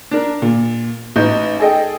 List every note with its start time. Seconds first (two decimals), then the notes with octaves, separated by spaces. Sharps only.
0.11 D4 A#4
0.42 A#2
1.16 A1 D#4 G6
1.60 G#4 A4 D#5 G5